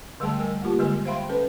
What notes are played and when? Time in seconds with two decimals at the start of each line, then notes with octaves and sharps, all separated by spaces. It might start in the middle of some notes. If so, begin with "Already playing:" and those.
0.20 D3 G3 A3 G#4 G5 A5
0.40 G3 A#4 G#5
0.62 A#3 F4 G4 A5
0.79 D3 G3 G#3 G#4 G#5
1.05 C5 E5 F5 G5 B5 C6
1.29 C#4 A4 B4